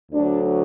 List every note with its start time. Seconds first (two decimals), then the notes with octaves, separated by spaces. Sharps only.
0.12 D2 D3 F#3 D4